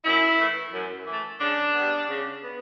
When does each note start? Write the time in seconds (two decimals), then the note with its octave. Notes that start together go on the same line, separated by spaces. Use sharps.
0.04 F#2 E4
0.38 E3 A3
0.73 F#2
1.07 E3 A3
1.40 C#3 D4
1.74 G3 B3
2.09 C#3
2.43 B3